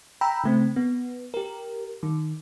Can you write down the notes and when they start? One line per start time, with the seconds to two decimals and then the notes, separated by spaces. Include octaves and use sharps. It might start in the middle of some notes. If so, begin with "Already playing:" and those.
0.21 G5 A#5 B5 E6
0.44 C#3 A3 C4
0.76 B3
1.34 G4 A#4
2.03 D#3